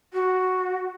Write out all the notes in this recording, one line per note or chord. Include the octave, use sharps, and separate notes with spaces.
F#4